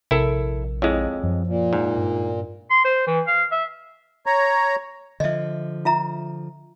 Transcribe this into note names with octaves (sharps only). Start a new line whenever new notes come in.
A#1 C3 E4 A4 A#4
F2 G#3 E4 C#5
F#2 F3
A#2
G#2
G2
C6
C5
E3
F5
E5
C#5 A#5
D3 F3 D#5 E5
F4 E5 A#5